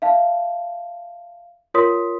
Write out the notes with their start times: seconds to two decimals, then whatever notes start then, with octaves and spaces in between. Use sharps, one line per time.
0.02 E5 F5 A5
1.74 F4 A#4 C#5 C6 D#6 B6